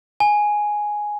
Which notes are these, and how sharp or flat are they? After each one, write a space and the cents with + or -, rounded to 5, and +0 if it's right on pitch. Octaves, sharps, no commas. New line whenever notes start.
G#5 +5